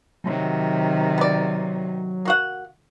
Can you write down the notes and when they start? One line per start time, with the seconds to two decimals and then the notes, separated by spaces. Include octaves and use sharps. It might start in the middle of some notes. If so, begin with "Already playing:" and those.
0.24 C3 D#3 F#3
1.18 B3 D5
2.25 A#3 F#4 F#5